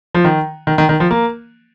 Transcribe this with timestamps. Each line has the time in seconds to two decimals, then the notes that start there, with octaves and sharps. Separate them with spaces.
0.15 F3
0.24 D#3
0.67 D#3
0.78 D#3
0.89 D#3
1.00 F3
1.11 A#3